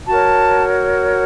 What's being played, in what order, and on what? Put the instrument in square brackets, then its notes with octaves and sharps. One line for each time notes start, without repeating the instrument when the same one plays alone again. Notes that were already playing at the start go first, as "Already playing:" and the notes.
[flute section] F#4 A#4 C#5 A5